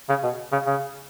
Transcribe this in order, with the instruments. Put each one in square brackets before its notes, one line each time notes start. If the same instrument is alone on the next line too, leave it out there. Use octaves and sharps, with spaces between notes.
[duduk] C#3
B2
C#3
C#3